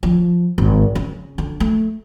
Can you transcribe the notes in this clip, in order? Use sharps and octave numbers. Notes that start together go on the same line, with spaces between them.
F3
G#1
C#3
D3
A3